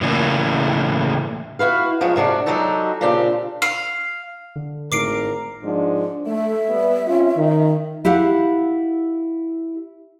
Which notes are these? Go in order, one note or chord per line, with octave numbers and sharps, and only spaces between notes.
A2 C#3 E3 A3 A#3
E4 F#4 B4 F5
F3 F#3 G#3 F#4
G#2 C3 D4 F#4
F#3 G#3 D#4 F#4 G4 A4
A#2 C#3 C4 D4 G4
F5
D3
G#1 A2 A#4 D6 C7 D7
G#2 F3 D4
A3 E5
G3 B3
C4 C#4 F4
D#3
E4 G4 F5 F#5